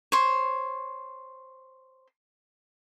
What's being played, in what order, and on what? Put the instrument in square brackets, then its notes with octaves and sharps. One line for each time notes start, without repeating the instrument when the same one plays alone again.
[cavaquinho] C5 C#5